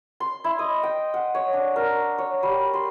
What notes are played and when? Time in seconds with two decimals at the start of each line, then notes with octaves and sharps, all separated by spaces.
0.20 C6
0.44 E4
0.59 D#5
0.83 G5
1.14 F#5
1.35 C#5
1.53 D4
1.76 A#4
2.18 C#5
2.43 G3
2.73 C6